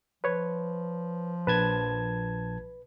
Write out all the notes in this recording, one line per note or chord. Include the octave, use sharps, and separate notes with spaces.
F3 B4 C#5
A#1 B4 A5 G#6